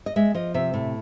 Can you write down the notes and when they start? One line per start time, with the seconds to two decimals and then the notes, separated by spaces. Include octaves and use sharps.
0.06 D#5
0.16 G#3 E5
0.34 F3 D#5
0.54 C3 E5
0.74 A2